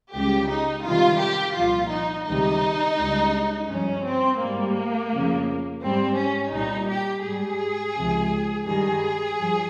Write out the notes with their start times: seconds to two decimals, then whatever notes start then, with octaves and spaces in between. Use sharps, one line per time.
0.14 C#2 C#3 G3 G4
0.50 D#4
0.85 F2 C3 D#3 G3 F4
1.21 G4
1.56 C2 A#2 F3 F4
1.92 D#4
2.27 C#2 C3 D#3 G3 D#4
2.99 C#2 C#3 G3
3.69 G2 F3 C#4
4.04 C4
4.40 G#2 G3 A#3
5.11 F2 C#3 F3
5.82 G#2 G3 C4
6.17 C#4
6.53 C2 A#2 G3 D#4
6.89 G4
7.24 G#2 G3 G#4
7.95 C#2 C3 F3
8.66 G2 D#3 G3 G#4
9.37 G2 F3